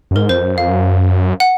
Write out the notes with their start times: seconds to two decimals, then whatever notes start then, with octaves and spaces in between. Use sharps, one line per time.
0.11 F#2
0.16 G#2 A#4
0.29 F2 C5
0.44 F#2
0.56 F2 F5
0.69 F#2
1.40 F#5